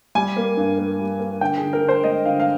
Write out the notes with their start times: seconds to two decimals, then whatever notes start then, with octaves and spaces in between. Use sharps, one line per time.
0.15 G3 G#5
0.37 A#3
0.57 G2
0.78 A#3
0.99 G3
1.20 A#3
1.41 D3 G5
1.57 G#4
1.63 D3
1.73 A#4
1.83 D3
1.88 C5
2.04 G#3 D#5
2.25 D3 F5
2.40 F5